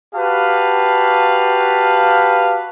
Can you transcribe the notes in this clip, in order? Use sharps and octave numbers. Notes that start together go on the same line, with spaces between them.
F#4 G4 B4 F5 A5